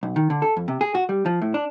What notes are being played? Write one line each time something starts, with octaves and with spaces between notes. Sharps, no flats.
B1
D#3
D3
A4
F2
C3
G#4
F#4
G3
F3
A2
D4